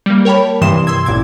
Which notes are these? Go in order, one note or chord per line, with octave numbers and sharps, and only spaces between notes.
G3 A#3
A#4 C#5 G5 A5 B5
G2 C3 E3 C6 D#6 E7
C6 E6 G#6
A1 A#2 D6 G#6